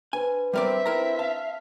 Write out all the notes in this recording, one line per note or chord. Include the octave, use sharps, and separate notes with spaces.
D4 B4 C5 G#5
G3 C4 A#4 D5 E5
C4 E4 A#4 A#5
F5 A5